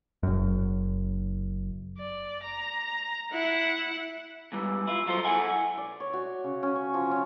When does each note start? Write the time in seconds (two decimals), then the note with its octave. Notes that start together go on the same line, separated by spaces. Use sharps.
0.23 F#1 F#2
1.98 D5
2.43 A#5
3.32 E4 F#5
4.52 E2 G#2 E3 G3
4.87 E4 F4
5.07 F#3 E4 F4 A4 C5
5.25 E4 A4 F#5 G#5
5.78 D5
6.00 C#5
6.13 F#4
6.44 C#3
6.63 C#4
6.75 C#6
6.94 F3
7.11 C#4